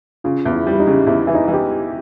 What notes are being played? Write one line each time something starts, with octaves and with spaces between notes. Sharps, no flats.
C#3 F4
E2
E4
G3 E4
D#4
C#3
E2 E4
E3
D#4
E3
G4